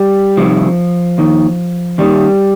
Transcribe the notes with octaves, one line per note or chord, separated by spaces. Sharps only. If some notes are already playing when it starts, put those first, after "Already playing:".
Already playing: G3
C2 C3 D#3 F3
D#2 D#3
D#2 D#3 G3